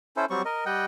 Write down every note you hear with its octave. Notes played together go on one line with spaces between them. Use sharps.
C#4 E4 A4 C5
F#3 G3 C4 C#6
A#4 D#5
G3 D#5 F#5 G5